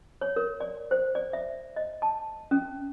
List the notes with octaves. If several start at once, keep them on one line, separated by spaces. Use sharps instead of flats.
C#5
A#4
D5
C5
D5
E5
D#5
A5
C#4